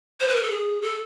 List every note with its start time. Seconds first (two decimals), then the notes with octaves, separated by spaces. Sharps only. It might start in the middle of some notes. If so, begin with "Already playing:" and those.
0.20 C5
0.28 B4
0.36 A#4
0.43 A4
0.50 G#4
0.82 A4